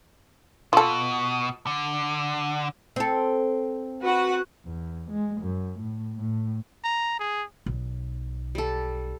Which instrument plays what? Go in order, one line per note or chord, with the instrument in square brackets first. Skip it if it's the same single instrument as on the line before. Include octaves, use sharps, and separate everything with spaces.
[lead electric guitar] B2 [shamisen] F4 A4
[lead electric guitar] D3
[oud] C4 A4
[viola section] F#4 B4 F#5
[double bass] E2
G#3
F#2
A2
A2
[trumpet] A#5
G#4
[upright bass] B1
[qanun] G3 A4